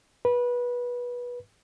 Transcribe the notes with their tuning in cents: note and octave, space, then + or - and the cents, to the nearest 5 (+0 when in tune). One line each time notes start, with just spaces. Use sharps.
B4 -20